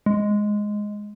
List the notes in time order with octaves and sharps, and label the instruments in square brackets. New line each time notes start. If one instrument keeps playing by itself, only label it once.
[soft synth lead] G#3